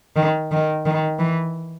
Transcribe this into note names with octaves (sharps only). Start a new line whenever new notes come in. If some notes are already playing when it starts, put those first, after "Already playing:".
D#3
D#3
D#3
E3